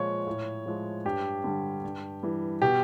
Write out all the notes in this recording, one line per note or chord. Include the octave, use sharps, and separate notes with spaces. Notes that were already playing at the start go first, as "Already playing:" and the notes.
Already playing: A#2 F3 G#3 C#5
A2
F3 G#3
G2 G4
D3 G3
G2
E3 G3
B2 G4